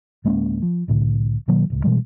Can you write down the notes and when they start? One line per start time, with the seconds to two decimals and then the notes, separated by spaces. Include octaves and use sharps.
0.25 D1 G#3 A#3 C#4
0.62 F3
0.88 C2 A2 D3
1.48 B2 D#3 F#3 A#3
1.70 D1 C#2
1.84 B2 E3 G3 G#3